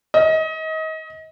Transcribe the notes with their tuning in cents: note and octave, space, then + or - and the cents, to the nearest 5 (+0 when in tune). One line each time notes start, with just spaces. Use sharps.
D#5 +30